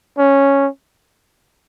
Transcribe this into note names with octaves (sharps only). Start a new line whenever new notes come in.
C#4